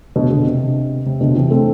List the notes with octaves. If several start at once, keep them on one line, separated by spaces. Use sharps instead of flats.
B2 D3
B2 D3
C3
C3
B2 D3
C3 E3
A3 C4